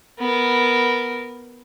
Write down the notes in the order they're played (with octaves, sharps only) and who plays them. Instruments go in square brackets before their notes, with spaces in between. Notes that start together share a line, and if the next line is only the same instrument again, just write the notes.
[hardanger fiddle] B3 A#4